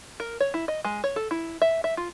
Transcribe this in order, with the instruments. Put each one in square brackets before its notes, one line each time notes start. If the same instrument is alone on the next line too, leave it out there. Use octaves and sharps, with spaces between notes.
[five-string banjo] A#4
C#5
E4
D#5
G#3
C#5
A4
E4
E5
E5
F4